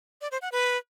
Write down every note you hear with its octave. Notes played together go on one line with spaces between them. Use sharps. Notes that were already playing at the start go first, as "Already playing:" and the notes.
D5
C5
F#5
B4